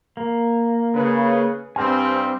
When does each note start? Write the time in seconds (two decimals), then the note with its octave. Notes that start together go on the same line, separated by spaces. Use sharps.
0.17 A#3
0.94 C#3 B4
1.76 G2 G3 C4 G#5 F6 G6